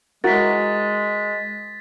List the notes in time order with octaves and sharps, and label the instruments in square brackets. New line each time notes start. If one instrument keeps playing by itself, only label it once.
[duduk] G#3 [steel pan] E4 F#4 A#4 [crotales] A6 B6